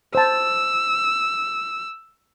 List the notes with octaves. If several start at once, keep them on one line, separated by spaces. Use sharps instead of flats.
C5 A5 E6